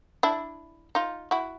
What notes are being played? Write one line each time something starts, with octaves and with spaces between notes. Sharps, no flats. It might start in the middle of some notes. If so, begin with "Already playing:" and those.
D4 E4
D#4 F4
E4 F#4